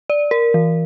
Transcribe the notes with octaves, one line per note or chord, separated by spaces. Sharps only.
D5
A#4
E3